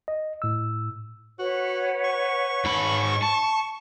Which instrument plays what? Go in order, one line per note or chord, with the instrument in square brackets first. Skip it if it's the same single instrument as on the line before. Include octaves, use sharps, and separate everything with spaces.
[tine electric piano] D#5
A2 E6
[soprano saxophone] F#4 [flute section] B4 C#5 F#5
[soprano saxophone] C#6
[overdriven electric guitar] G#2 B5
A5